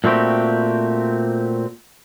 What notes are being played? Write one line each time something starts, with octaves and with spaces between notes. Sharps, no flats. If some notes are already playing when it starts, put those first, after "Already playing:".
A#2 A3 C4 F#4 G4